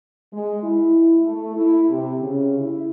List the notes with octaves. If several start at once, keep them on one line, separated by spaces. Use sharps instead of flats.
G#3
E4
A3
E4
C3
C#3
E4